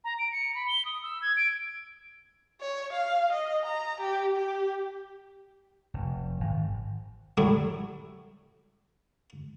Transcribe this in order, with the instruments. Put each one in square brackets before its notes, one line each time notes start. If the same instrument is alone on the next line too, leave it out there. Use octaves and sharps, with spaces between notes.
[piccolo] A#5
D7
C#7
B5
G7
D#6
E6
G#6
D7
[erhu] C#5
F5
D#5
A#5
G4
G4
[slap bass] F1
G#1
[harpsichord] F#3 G3 A3 E4